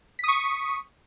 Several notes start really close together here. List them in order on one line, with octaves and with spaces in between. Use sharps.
B6 D#6 C#6